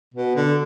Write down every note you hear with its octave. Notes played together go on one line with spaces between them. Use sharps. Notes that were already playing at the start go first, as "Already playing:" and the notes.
B2
D3